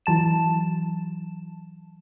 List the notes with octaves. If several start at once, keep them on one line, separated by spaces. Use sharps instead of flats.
E3 F#3 A5 E7